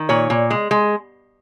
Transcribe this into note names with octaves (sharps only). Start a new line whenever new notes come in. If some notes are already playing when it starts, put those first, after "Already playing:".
Already playing: D#3
A#2 C#5
A#2
G#3
G#3